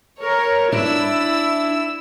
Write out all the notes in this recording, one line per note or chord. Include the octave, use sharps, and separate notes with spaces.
A#4 C#5
D4 E4 E6